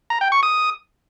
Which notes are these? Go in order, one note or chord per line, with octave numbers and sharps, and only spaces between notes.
A#5
G5
C#6
D#6